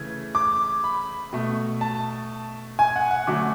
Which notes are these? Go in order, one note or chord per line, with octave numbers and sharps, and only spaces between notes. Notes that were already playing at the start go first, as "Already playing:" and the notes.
Already playing: C#3 E3 A3 G#6
D6
B5
B2 A3
A5
G#5
F#5
F#5
D3 F#3 A3 D6